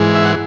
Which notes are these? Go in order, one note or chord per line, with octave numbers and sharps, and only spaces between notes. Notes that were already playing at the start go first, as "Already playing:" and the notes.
Already playing: G#2 E3 G#3
E5
F#5